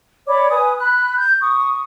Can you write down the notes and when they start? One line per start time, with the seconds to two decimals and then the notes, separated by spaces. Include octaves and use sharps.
0.28 C#5 D5 B5 D6
0.50 B4 G#5 D#6
0.79 B5 F#6
1.17 G6
1.41 C#6 D#6